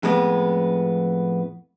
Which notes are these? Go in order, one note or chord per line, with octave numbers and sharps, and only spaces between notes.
F2 A2 G#3 B3